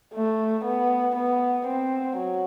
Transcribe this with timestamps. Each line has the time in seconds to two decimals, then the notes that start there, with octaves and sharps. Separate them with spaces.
0.14 A3
0.65 B3
1.15 B3
1.66 C4
2.17 F#3